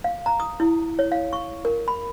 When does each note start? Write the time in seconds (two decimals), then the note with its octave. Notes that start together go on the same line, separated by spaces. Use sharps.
0.04 F5
0.26 A#5
0.40 D#6
0.60 E4
0.99 C#5
1.12 F5
1.33 C#6
1.65 A#4
1.88 B5